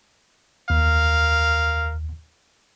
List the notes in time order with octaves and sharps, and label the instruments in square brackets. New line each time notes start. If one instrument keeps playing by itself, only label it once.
[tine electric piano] D#2 [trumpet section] A#4 F5